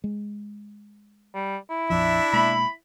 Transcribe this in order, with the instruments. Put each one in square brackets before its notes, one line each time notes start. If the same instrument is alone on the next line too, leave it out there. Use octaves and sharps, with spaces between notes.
[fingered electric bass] G#3
[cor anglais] G3
E4
[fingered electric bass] A#1 F2 F3 [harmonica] D4 E5
[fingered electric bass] B2 G#3 A#3 [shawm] B5